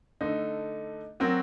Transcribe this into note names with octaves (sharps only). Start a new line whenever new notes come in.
D3 A3 D#4
F#3 C4 F#4 A#4